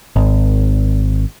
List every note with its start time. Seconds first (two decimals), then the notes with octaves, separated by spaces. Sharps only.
0.16 G#1